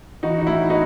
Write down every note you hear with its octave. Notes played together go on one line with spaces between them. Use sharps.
E3 D#4 F#4
D#4
A2 E4
B3 D#4 F#4